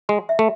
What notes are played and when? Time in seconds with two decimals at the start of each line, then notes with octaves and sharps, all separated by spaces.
0.09 G#3 C6
0.29 E5
0.39 A3